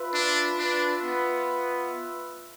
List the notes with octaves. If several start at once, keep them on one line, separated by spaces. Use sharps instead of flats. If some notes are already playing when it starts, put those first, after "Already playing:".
Already playing: F4 B4 E5
D4
D4
B3